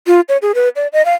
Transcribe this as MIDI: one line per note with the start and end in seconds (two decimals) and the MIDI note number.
0.07 0.21 65
0.29 0.37 73
0.42 0.52 68
0.55 0.69 71
0.76 0.87 74
0.93 1.04 75
1.05 1.14 77